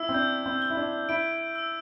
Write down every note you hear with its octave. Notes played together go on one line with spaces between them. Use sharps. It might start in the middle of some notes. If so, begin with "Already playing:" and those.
Already playing: E4 E6
C4
D4 G6
C4
G7
E4
D4
E4 D7
E6